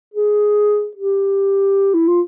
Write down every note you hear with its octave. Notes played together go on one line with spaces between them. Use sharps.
G#4
G4
E4
F4